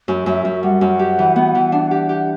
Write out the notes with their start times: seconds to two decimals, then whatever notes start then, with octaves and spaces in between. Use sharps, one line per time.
0.08 F#2
0.26 F#2 E5
0.45 F#2
0.63 G3 F#5
0.81 F#2
0.99 G4
1.19 E3
1.36 B3
1.55 E3
1.72 D4
1.91 G4
2.09 G4